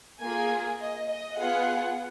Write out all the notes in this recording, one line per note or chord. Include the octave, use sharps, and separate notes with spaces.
A#3 F4 G#4 G#5
D#5
D#5
B3 F4 G#4 F#5